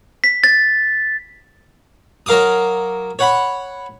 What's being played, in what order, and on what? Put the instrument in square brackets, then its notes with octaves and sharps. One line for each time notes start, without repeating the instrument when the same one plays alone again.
[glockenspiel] B6
A6
[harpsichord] F#3 A#4 F5 D6 D#6
C#5 F#5 B5